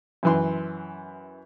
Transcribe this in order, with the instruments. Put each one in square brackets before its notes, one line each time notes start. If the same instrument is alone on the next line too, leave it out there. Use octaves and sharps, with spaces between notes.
[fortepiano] F#2 E3 C6